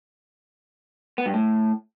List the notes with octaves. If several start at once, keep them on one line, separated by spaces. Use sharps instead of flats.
B3
G2
A2